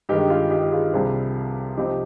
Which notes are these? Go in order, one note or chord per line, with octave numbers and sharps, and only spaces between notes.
G2 D#3 G#3 D#4 G4
F4 G#4
D#4 G4
G4
F4 G#4
C2 C3 G3 F4 G#4
C3 F3 C4 D#4 G4